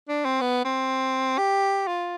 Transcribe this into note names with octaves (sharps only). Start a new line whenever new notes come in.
D4
C4
B3
C4
G4
F4